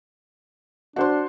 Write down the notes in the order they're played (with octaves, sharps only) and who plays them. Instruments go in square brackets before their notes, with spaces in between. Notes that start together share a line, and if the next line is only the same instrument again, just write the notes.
[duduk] D4 [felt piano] F#4 C5 C6